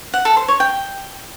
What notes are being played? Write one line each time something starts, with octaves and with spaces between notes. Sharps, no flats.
F#5
A4
C5
C#5
G5